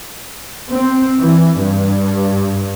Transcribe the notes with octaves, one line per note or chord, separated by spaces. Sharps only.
C4
E3
G2